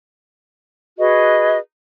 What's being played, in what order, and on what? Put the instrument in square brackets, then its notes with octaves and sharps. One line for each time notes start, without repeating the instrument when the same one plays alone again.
[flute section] F#4 G#4 B4 D#5